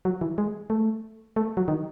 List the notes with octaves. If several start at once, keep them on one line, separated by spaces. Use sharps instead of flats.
F#3
E3
G#3
A3
A3
F#3
D#3